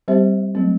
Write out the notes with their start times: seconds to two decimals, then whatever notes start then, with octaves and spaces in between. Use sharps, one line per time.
0.08 G3 C4 G4 C5 E5
0.55 F#3 A3 C4